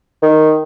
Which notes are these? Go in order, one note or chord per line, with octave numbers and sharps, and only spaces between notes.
D#3